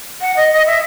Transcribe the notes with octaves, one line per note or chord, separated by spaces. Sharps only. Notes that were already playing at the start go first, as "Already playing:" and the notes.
F#5
D#5
D#5
E5